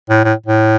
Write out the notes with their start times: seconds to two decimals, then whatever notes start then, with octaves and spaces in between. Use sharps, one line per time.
0.10 A2
0.24 A2
0.46 A2